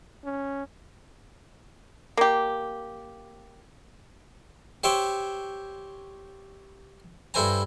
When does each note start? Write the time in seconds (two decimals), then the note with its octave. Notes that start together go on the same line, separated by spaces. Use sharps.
0.24 C#4
2.17 A#3 G4
4.84 G4 C5 C#5 E5 G5
7.34 G2 E4 A4 C5 G#5 A#5